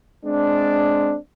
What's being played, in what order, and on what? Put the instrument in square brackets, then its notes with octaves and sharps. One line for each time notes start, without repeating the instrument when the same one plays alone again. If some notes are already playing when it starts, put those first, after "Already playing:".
[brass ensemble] G#3 C4 D4